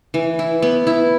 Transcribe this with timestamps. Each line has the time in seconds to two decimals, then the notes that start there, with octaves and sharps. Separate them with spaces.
0.14 E3
0.39 E4
0.62 B3
0.87 E4